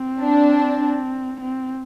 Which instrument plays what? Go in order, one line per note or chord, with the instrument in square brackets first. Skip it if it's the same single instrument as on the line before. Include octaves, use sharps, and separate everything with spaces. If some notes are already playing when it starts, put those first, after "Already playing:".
Already playing: [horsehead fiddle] C4
[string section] D4
[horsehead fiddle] C4